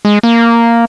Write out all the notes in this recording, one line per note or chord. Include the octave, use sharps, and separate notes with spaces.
G#3
A#3